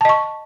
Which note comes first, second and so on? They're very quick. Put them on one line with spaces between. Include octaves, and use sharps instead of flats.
A5 D#5 C#6